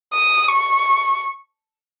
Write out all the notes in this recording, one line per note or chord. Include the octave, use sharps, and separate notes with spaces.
D#6
C#6